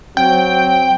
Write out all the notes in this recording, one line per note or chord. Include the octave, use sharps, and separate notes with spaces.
F#3 C4 G5